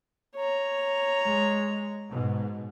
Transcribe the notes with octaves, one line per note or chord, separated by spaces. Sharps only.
C#5 A#5
G#3
G#2 B2